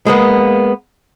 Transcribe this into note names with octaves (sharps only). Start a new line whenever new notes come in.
G#3 A#3 B3